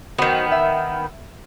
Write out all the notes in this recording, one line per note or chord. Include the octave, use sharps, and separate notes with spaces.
D#3 F#3 B3 F#4 C5
E5